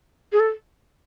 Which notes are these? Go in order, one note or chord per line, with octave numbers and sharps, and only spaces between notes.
G#4
A4